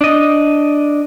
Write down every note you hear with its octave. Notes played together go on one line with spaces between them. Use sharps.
D4 D#5